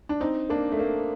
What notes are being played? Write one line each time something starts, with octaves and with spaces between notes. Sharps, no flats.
D4
C4 D#4
A#3 D4
A3
A#3